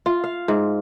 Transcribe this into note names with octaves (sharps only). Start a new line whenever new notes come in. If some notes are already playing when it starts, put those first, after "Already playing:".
F4
F5
G#2